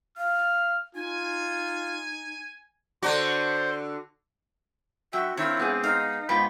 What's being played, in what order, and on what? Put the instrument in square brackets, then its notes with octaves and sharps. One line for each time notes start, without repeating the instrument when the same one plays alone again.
[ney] F5 [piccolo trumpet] F6
[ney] D#4 [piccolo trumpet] F4 [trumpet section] G#5
[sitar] D3 D4 F#4 [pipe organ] C5
[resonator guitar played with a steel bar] F#2 [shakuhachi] F#4 [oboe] E5 [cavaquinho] G5
[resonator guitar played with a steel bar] D#3 [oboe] C4 [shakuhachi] E4 [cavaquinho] C#5 F5
[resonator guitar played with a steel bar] G#2 B3 G#4
[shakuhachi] D#4 [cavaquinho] F5
[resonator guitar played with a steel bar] G#2 B3 F4 [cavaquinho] G5 [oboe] B5